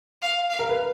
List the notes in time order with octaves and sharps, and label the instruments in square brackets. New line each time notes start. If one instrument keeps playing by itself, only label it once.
[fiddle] F5
F5
[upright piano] A#4
B4